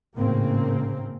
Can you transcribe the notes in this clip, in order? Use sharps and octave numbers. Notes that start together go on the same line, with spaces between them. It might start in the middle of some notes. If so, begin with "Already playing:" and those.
G#1 A2 C#3 A#3 C4